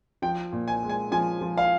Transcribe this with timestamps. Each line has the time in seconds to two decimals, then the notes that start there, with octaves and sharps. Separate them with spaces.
0.22 F3 G5
0.52 A#2
0.68 G#5
0.83 G#3
0.89 G#5
1.12 F3 G#5
1.41 F3
1.58 F5